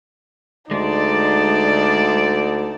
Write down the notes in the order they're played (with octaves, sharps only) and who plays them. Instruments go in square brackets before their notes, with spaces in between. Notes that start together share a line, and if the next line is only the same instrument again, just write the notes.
[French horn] D2 [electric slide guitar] G#3 [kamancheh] D#4 A5 [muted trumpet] D5